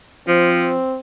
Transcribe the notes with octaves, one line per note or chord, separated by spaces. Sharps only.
F3 C4